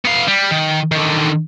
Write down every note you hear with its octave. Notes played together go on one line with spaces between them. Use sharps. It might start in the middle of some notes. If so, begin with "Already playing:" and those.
B3 F5
G3
D#3
D3 D#3